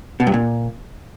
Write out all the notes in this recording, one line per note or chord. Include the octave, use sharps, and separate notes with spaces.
B2
G2
A#2